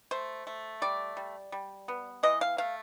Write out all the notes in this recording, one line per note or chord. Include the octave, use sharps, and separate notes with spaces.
A3 C5
A3
G3 D5
G3
G3
B3
E3 D#5
F5
A3 F5